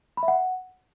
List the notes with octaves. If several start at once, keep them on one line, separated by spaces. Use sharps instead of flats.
B5
E5
F#5